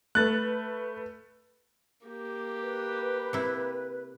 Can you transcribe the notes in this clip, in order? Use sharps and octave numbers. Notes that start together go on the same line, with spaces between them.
A3 B4 F#6 A6
A#3 G4
B4
C3 E4